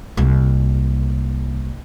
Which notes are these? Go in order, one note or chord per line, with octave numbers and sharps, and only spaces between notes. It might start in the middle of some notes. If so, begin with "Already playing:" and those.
C2 A#3